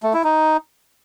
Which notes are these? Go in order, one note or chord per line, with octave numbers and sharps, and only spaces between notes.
A3
E4
D#4